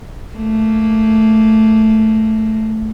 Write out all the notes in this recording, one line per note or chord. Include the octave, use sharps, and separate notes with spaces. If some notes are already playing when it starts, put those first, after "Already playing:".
A3 A#3